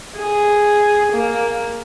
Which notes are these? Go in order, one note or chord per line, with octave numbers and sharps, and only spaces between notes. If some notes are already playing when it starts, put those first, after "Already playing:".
G#4
A#3